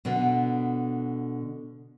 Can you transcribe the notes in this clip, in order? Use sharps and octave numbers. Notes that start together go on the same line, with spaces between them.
B2 D3 B3